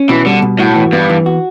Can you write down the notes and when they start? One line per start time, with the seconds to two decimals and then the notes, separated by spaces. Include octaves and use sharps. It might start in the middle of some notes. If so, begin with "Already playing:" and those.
Already playing: C#4
0.09 B2 E3
0.26 D3 G3
0.42 B2
0.59 A2 F#4
0.76 E3
0.93 G2 B3
1.09 E3
1.26 F#4